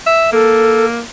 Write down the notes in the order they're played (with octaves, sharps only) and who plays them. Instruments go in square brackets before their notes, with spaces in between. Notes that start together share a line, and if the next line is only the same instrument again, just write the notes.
[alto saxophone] E5
[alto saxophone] A#3 [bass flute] A4